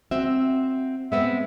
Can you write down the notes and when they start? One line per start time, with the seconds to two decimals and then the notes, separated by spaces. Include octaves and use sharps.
0.11 C4 F#4 E5
1.12 G#3 B3 C4 E5